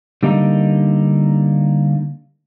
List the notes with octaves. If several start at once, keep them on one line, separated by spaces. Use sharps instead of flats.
D3 G3 A#3 D#4